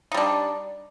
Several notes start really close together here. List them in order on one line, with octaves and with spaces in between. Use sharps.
D#4 G3 D4